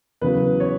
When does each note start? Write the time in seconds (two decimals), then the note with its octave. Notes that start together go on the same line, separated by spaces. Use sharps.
0.21 E2 C#3 F#3 B4
0.60 C#5